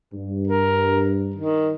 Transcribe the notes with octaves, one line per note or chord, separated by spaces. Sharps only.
G2
A#4
D#3